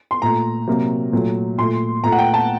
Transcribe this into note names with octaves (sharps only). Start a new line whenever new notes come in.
C6
A#2 A3 A#5
C3 F#3 A#3
A#2 F#3 A3
A#2 A3 C6
A#2 A3 A#5
F#5
G5
A5